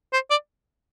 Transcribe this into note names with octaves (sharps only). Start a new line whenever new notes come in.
C5
D5